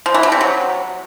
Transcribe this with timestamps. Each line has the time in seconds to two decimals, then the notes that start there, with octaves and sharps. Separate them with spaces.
0.06 F3
0.14 E3
0.23 D3
0.32 C3
0.41 F#3